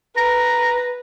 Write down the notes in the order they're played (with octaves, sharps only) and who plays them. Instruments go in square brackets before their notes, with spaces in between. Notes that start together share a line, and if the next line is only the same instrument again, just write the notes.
[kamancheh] B4 [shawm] A#5